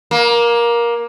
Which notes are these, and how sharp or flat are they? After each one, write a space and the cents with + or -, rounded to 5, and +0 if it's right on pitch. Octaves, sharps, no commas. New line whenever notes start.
A#3 +15